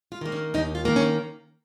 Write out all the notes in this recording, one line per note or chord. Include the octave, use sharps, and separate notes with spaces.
F4
D#3 A#3
C#4
D#2 D#4
F4
D#3 A#3
C#4